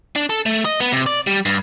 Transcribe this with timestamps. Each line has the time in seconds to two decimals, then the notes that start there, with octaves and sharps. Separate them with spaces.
0.16 D4
0.30 A4
0.46 A3
0.65 D#5
0.81 B3
0.93 C3
1.06 D5
1.27 G3
1.46 G2